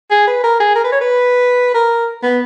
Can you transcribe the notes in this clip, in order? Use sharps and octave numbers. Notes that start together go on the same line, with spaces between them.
G#4
B4
A#4
G#4
A#4
B4
C#5
B4
A#4
B3